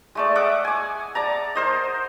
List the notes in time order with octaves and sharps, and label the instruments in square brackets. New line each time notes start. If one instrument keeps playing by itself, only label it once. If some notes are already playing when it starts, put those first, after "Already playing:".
[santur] G#3 A3 D5
D#5 E5 F#5 D6
G#5 D6
D5 A5 A#5
A#4 C5 D#5